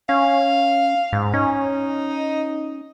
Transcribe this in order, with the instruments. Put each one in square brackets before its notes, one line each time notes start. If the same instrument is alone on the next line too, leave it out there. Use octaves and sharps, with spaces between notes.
[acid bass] C#4 [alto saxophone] F5
[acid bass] G#2
[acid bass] C#4 [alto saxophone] D#4